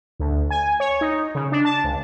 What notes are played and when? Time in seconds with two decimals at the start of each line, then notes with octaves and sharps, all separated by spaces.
0.20 D2
0.50 G#5
0.80 C#5
1.01 D#4
1.35 C#3
1.52 D4
1.65 A5
1.84 C#2